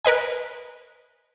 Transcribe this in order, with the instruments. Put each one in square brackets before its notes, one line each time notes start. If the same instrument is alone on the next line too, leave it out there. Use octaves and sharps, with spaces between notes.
[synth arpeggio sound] A#4 B4 D#5 G#5